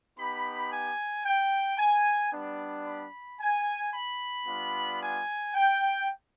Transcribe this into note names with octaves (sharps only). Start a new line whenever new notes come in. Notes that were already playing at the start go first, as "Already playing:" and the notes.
B3 D#4 G4 B5
G#5
G5
G#5
G3 B3 D4
B5
G#5
B5
G3 B3 D4 F4
G#5
G5